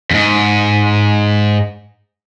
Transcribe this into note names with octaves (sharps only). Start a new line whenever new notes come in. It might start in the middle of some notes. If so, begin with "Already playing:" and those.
F2 G#2